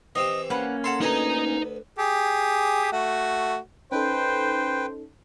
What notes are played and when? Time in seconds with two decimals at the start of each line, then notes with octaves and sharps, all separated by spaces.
0.15 E3 C4 G4 D#5
0.50 A#3 C#4 B4 F5 F#5
0.84 A4 F#5 A#5 C6
1.01 D2 D#4 B4 D#5 G#5 A#5
1.99 G4 G#4
2.92 A3 F#4
3.92 C#4 D#4 A4 B4 C5 G5